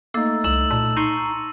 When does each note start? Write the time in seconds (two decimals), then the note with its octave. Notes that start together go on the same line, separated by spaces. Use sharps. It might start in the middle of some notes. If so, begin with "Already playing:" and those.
0.14 A3 A#3 D#4 E6 A6
0.44 C2 E6 E7 F#7
0.71 A#2 A5
0.97 D#4 A#5 C6 C#6 D#7